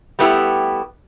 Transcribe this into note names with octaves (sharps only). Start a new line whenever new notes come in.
G3 A3 B3 E4 G4